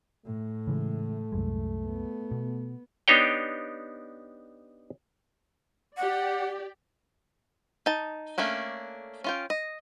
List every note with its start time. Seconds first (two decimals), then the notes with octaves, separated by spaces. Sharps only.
0.25 A2 A3
0.67 C#3 E3 G#3
1.32 C2 F#2 G#3
1.86 B3
2.31 B2
3.08 B3 D4 D#4 G4 C#5 G5
5.97 G4 D5 F#5
7.86 D#4 A5
8.38 A3 A#3 C#4 D4
9.24 C#4 F4 G5
9.50 D#5